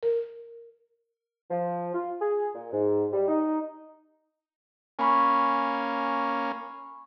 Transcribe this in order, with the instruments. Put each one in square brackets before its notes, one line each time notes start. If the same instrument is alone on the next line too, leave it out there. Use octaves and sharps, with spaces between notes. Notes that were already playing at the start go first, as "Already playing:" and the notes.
[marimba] A#4
[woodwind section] F3
F4
G#4
A#2
G#2
G3
D#4
[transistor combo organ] A#3 C#4 [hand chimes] G#5 B5 C#6